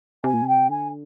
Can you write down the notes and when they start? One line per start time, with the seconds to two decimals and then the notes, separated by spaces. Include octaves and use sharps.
0.24 C3 G#5
0.33 A#2
0.42 C3
0.48 G5
0.69 D3 G#5